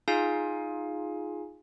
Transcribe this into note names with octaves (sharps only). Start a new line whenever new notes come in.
D#4 F4 G#4 F5 G#5